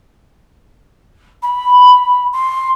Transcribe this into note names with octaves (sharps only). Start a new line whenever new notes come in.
B5
C6